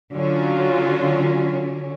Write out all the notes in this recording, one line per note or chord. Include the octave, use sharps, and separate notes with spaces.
D3 F#3 C#4 F4